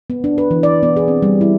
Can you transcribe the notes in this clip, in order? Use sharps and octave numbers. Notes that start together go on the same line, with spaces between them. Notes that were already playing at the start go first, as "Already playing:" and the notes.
B3
D4
B4
E3
D5
B3
G#4
C4
G3
E4